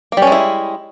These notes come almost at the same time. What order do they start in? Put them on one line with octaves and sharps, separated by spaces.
A#3 G3 C#4 G#3 E4